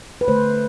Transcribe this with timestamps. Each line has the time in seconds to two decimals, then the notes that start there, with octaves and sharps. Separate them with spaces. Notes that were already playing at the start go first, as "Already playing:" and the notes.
0.21 B4
0.28 D3 A3 C5